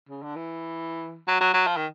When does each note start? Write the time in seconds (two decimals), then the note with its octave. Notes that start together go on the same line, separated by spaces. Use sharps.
0.09 C#3
0.23 D3
0.36 E3
1.28 F#3
1.41 F#3
1.54 F#3
1.67 F3
1.77 D#3